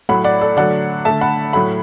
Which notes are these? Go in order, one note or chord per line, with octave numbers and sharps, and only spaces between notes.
A2 F#3 A3 F#5 B5
D5 F#5
A4 D5
D3 F#3 A3 D5 F#5
D3 A3 E5 A5
F#5 B5
A2 F#3 A3 F#5 B5